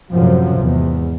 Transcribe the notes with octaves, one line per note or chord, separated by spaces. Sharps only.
F#2 A2 C3 F3 F#3
E2 G#2